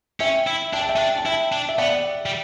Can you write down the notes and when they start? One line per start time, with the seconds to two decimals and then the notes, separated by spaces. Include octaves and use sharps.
0.20 C#4 E5 G5
0.47 E4
0.73 D4 G5
0.81 A5
0.89 E5 G5
0.96 C#4
0.99 D4
1.19 A5
1.26 E4 E5 G5
1.52 D4
1.69 E5
1.78 B3 D5 F#5
2.26 G3